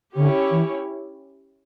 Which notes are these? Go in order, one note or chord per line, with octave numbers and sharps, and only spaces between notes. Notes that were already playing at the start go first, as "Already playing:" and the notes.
D3 C#4 E4 G4 C#5
E3